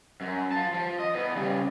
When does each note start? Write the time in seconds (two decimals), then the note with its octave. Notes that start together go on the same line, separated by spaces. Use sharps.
0.21 F#2
0.52 F4 A5
0.74 F3
0.99 D#5
1.15 E2 B3
1.36 C#3 G3